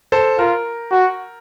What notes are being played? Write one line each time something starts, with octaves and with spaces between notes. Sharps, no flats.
A4 C5
F4 A#4
F#4